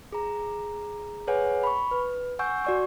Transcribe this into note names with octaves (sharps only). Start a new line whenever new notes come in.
G#4 A#5
G#4 B4 C#5 F#5 G#5
B5 C#6
B4
F#5 G#5 C#6 E6 G6
F#4 D5 C#6